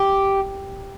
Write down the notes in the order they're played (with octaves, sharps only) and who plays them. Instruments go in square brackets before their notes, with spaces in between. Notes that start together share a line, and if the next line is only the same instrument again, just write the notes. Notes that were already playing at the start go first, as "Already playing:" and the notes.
Already playing: [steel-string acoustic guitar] G4